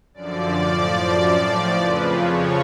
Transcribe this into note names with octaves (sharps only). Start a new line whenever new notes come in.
F#2 D3 F3 D5
A2 F3
F#2 F3
A2 F3
F2 C#3 F3 B4
F2 C#3 F3 C#5